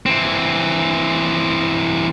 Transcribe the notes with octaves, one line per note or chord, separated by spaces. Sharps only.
E3 C4